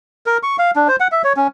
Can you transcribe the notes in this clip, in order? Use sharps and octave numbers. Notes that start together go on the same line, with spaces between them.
A#4
C#6
F5
D4
C5
F#5
E5
C#5
C#4